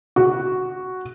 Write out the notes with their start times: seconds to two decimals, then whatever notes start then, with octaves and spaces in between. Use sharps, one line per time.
0.16 F#4